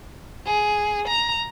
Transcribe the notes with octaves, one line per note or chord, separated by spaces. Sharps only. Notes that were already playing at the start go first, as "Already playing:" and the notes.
G#4
A#5